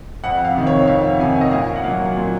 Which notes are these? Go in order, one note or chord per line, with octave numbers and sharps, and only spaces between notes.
F2 F#5
F5
C3 D#3
C#5
F2 F5
C3 D#3 G#5
D#5
A#2 F5
F#5
F#3 A#3 F5
A#2